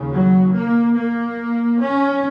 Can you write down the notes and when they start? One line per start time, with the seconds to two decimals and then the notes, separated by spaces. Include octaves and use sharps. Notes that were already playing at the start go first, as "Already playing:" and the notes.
Already playing: D#2 C#3
0.13 F#3
0.55 A#3
0.97 A#3
1.81 C#4